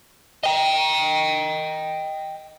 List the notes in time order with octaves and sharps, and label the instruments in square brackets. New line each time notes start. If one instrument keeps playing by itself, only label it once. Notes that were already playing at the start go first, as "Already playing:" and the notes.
[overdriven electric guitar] D#5 G5